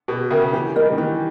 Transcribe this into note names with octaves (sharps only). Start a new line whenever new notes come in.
B2 G4
C#3 A#4 E5 G5
E3 G4
G3 A#4 D#5
D#3
E3 G4